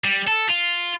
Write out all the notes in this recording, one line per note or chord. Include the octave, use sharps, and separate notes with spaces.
G3
A4
F4